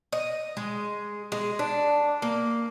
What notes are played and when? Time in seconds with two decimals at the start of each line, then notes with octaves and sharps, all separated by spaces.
0.12 D#5
0.57 G#3
1.32 G#3
1.59 D4
2.22 A#3